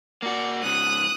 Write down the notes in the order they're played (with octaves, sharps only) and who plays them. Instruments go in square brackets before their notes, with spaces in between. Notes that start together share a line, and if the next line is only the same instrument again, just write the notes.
[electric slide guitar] A#3 F#4 [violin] D5
[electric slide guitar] G#2 C#3 [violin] D#6 F#6